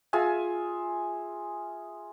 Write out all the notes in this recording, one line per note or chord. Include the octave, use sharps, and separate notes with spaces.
F4 G#4 E5 G#5